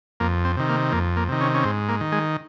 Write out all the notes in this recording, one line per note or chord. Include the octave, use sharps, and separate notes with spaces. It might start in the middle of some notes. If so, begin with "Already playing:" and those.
F2 A#3
C4
C3 D#3
A#3
F2 A#3
A#3
C3 D#3
C#4
C#4
G#2 C4
A#3
D#3
G#3